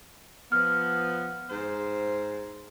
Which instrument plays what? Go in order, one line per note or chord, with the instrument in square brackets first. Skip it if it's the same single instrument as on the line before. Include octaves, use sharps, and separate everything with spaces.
[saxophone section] F3 B3 [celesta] F6
[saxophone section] G#2 C5